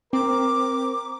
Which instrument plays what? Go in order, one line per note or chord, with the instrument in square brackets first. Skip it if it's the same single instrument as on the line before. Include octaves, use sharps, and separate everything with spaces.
[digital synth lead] C4 [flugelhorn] A#4 [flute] D6